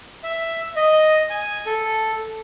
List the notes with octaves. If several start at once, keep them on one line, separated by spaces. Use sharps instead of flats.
E5
D#5
G#5
A4